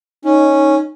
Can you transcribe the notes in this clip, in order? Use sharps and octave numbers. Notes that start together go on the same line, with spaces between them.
C#4 D#4